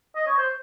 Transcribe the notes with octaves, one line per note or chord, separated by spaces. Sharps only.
D#5
C#5
C5